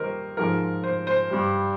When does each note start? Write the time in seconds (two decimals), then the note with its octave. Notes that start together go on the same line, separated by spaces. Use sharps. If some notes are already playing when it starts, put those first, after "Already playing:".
Already playing: D#2 D#3 G3 A#4 C5 D#5
0.37 G#2 F3 G#3 A#4
0.84 C5
1.07 C5
1.30 G2 G3